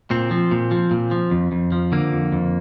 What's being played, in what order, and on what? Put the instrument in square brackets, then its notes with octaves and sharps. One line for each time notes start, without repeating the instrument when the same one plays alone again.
[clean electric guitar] A#2 C4
F3
A#2
F3
A#2
F3
F2
F2
F3
D3 A#3
F2
F2